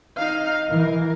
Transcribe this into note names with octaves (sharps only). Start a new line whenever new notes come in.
D#4 F5
E3 A#4